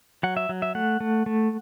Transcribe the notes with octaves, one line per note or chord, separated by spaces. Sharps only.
F#3 F#5
E5
F#3
E5
A3 F#5
A3
A3